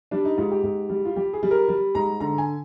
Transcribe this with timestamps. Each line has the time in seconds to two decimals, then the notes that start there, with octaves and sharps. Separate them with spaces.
0.11 G3 D4
0.25 D#4
0.37 G#2 F4
0.51 G4
0.63 G#2
0.89 G3
1.05 F4
1.16 G3 G4
1.33 G#4
1.43 G3
1.51 A#4
1.69 G3
1.95 G#2 A#5
2.20 D3 A#5
2.38 G#5